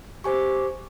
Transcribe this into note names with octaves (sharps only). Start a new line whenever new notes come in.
G4 C5 G#5 C#6